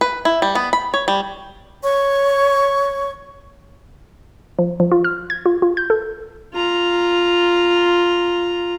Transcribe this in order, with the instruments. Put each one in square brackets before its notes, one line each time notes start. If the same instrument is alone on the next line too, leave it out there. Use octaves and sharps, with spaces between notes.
[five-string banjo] B4
E4
G3
B3
B5
C#5
G3
[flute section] C#5 C#6
[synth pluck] F3
F3
F4
F6
G#6
F4
F4
G6
A4
[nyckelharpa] F4 A#5